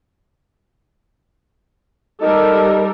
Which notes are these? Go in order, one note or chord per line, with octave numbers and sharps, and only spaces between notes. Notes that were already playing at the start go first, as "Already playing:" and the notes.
G3 D#4 A4 A#4